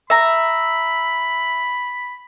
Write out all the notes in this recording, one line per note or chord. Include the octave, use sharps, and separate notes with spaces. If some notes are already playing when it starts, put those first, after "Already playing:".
E5 A#5 B5